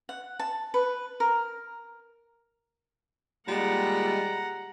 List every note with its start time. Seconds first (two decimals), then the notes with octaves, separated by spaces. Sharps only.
0.09 F#5
0.40 A5
0.74 B4
1.20 A#4
3.48 A#2 D#3 G3 G#3 F#5 A#5